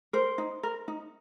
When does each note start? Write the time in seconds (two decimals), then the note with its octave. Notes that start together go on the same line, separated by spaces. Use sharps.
0.13 A#4 C5
0.38 D#4
0.63 A#4
0.88 D#4